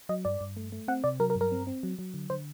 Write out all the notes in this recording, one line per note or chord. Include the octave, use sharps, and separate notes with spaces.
F#3 D#5
G2 D5
G2
A3
A3
C4 F#5
C3 D5
F#3 A#4
A#4
G2
A#4
C4
C4
F#3
F#3
D3
D3 C5